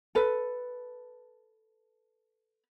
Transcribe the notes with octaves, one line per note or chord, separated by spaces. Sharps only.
A4 B4